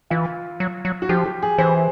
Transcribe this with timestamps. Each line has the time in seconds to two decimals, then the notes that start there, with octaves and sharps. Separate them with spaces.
0.10 E3 F4
0.60 F#3
0.85 F#3
1.02 F#4
1.09 F3 G4
1.26 G4
1.43 G#4
1.58 E3 C5